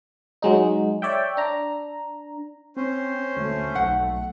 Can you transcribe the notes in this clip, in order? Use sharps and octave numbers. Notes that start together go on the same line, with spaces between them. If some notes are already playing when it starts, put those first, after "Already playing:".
F#3 G#3 D#4
C#5 D5 E5 G5
D4 A#5
C4 C#4 C5
D2 A3
B1 F#5